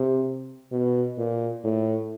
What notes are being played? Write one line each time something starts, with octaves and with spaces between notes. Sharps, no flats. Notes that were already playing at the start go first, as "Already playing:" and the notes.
Already playing: C3
B2
A#2
A2